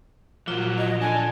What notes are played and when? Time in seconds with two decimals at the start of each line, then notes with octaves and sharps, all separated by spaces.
0.47 A#2 F3 F#3 F4
0.78 D#5
1.01 D4 A4 G#5